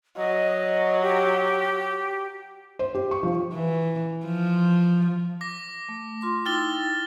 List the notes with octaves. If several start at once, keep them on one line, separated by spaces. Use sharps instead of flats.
F#3 D#5
G4
C5
G4
C#6
F3
E3
F3
D6 A#6
A3
F4 C6 D6
D#4 E4 G5 F6 A6 G7